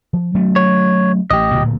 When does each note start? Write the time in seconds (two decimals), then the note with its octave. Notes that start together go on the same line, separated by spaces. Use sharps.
0.13 F3
0.35 F#3 A3 C#4
0.56 C#5
1.31 A1 G4 D#5
1.55 D1 A#2